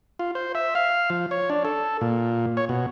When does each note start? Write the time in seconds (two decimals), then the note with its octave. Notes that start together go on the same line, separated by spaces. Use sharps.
0.19 F4
0.35 C5
0.55 E5
0.75 F5
1.10 F3
1.31 C#5
1.50 D4
1.65 A4
2.01 A#2
2.57 C#5
2.69 B2